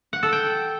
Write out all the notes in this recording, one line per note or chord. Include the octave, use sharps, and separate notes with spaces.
F#5
A4
G5